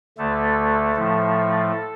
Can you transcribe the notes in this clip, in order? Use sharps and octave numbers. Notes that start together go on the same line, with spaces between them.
D2 D3 A3 A4
A2 F3 A3